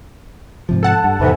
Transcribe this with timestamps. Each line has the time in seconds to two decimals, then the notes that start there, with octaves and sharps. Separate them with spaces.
0.69 G#2 C3 F3
0.83 A4 F#5 A5
1.04 G2
1.20 E2 G#2 C3 E3